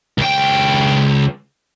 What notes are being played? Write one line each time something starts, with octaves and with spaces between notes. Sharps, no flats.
C#2 G5